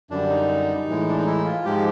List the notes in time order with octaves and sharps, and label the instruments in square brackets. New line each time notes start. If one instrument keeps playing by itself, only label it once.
[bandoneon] F#2 D3 G3 D4
D#4
A2 E3 G#3
D4
D#4
E4
F4
G#2 F3 G#3 G4